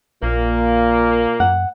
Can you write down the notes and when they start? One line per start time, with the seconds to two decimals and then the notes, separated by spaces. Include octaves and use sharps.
0.23 A#1 A#2 A#3
1.40 F#2 F#5